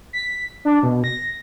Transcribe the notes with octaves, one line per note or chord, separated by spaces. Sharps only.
B6
D4
B2
A#6